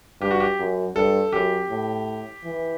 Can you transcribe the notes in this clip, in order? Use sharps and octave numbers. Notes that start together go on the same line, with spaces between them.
G2 G4
F#4
G4
F#2
G2 A4
F#2 G4
A2
E3